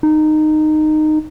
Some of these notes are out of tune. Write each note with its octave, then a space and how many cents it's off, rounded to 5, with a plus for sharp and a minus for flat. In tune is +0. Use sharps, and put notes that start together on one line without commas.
D#4 -15